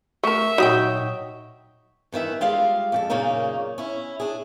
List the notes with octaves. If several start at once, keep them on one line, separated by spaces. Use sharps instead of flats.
A3 A#4 E5 C#6
A#2 F#3 D#4 C#5 F#5 G5 D#6
G2 D#3 E3 E5
G3 G#3 F4 D5 F5
F2 G4 A4
F#2 A#2 C#3 A#3 C#4 D#4
C#4 E4
D4 G#4